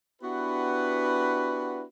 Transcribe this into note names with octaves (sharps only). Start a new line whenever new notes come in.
B3 D4 E4 F#4 G4 B4